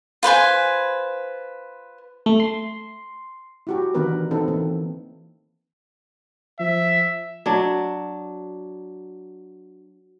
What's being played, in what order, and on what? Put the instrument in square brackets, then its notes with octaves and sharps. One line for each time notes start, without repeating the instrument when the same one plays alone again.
[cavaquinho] F4 B4 C5 G#5
[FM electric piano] A3
C6
[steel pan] E4 F#4 G4
D#3 E3 B3 D4 A#4 B4
C4 D#4 A4
E3 A#3
[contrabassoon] F3 [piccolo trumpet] E5
[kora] F#3 D4